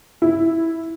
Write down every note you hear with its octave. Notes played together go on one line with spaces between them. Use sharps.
E4